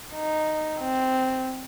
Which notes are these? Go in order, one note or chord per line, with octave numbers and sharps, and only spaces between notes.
D#4
C4